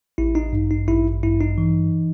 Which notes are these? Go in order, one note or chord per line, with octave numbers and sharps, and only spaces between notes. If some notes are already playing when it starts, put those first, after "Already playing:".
A1 E4
D#4
G2
D#4
A1 E4
G2 E4
D#4
E3